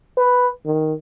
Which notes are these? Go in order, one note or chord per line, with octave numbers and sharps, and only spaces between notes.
B4
D#3